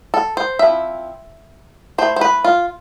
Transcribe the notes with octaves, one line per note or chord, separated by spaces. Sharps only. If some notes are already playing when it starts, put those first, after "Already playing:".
A4
C5
F3 C4 E4 E5
A3 E4 C5
C5
B4
F4